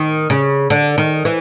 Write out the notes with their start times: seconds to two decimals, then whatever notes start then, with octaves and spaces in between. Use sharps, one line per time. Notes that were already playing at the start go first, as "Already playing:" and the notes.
Already playing: D#3
0.30 C#3
0.70 D3
0.98 D#3
1.25 E3